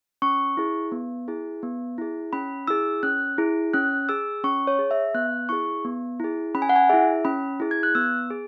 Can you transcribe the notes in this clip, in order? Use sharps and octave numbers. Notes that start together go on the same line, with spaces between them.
C#4 C#6
E4 G#4
B3
E4 G#4
B3
E4 G#4
C#4 B5
E4 G#4 E6
C#4 F#6
E4 G#4
C#4 F#6
G#4 E6
C#4 C#6
C#5
G#4
E5
B3 F#6
E4 G#4 C#6
B3
E4 G#4
C#4 B5
G#5
F#5
G#5
E4 G#4 E5
C#4 B5
E4 G#4
G#6
F#6
B3 E6
G#4